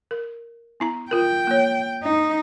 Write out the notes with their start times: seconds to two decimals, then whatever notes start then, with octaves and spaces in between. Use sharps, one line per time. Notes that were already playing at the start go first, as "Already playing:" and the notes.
0.11 A#4
0.80 B3 E4 A#5
1.11 F4 A#4 G5
1.47 A#3 C#5
2.03 D#4